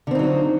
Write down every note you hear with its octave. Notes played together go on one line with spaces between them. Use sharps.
D3 F#3 C4 D#4 F4